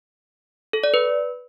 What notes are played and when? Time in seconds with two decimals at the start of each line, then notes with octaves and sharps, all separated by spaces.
0.73 A4
0.84 D5
0.94 B4